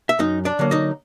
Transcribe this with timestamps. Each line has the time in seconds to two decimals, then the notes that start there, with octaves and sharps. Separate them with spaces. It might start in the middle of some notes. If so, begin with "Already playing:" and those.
0.09 E5
0.19 F#2 D#4 D#5
0.45 D4 D5
0.59 D3 F#3 A#3
0.71 D#4 D#5